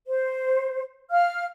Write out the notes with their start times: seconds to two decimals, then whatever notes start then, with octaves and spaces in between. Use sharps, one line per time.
0.07 C5
1.11 F5 F6